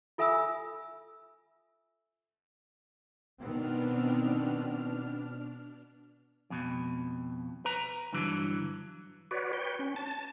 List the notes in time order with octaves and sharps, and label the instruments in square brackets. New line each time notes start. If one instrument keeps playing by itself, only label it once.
[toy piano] F4 A4 E5 G#5 B5 E6
[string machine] B2 D4 F6 [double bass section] D#3 B3 C4
[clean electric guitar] F2 B2
B4 A#5
G2 D3 E3 F#3
[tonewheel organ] F#4 B4 C#5 D5
B4 C#5 G5
C#4
A5